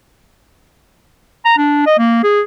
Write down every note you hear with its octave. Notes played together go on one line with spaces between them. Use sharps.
A#5
D4
D#5
A#3
G#4